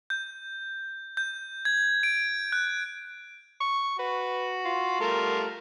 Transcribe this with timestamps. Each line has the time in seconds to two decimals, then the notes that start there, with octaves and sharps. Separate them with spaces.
0.10 G6
1.17 G6
1.65 G#6
2.03 D7
2.52 F#6
3.60 C#6
3.99 F#4 B4
4.65 F4
5.01 G3 A3 A#4